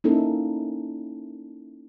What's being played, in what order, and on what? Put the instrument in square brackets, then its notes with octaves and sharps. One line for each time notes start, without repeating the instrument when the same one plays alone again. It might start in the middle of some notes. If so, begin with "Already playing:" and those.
[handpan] A#3 C#4 D#4 E4 A4